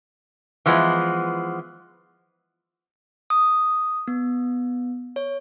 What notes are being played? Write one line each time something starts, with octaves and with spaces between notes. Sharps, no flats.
E3 F3 G#3 B3
D#6
B3
C#5